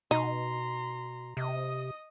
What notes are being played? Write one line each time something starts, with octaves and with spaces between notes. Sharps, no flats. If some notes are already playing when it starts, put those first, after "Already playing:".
B2 D#4 A#5 C6
C3 D#5 D#6